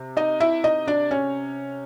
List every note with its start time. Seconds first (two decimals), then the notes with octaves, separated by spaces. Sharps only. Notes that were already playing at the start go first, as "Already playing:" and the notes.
Already playing: C3
0.17 D#4 D#5
0.40 E4 E5
0.64 D#4 D#5
0.87 D4 D5
1.11 C#4 C#5